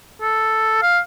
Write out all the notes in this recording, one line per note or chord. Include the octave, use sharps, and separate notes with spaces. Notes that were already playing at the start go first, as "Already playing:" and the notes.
A4
F5